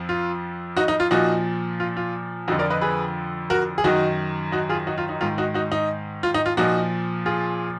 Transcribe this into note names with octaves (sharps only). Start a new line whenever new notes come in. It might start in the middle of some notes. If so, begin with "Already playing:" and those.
Already playing: F2 F3
F4
D#4 F#4
D#4
F4
A#2 F3 D#4 F#4
F4
F4
F2 D3 F3 D#4 F#4
A#4 D5
B4 D#5
G#4 B4
F#4 A#4
G#4
F#2 D#3 D#4 F#4
D#4 F#4
F4 G#4
D#4 F#4
F4
D#4
G#2 D#3 F4
D#4 F#4
D#4 F#4
D#4
F4
D#4
F4
A#2 F3 D#4 F#4
F4 G#4